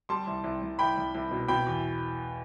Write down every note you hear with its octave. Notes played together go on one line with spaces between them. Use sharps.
G3 A5 C6
C2
C2
C2
C2 G5 B5
C2
C2
B2
B2 G5 B5
E2